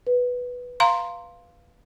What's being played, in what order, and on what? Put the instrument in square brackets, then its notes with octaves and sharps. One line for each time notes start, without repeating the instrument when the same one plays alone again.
[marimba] B4
[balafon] F5 A#5 C6